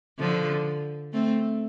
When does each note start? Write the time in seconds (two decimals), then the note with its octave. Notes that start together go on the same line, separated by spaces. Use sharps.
0.19 D3 F3
1.13 A3 C4